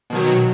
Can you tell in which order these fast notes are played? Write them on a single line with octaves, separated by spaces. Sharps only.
B2 D#3 F#3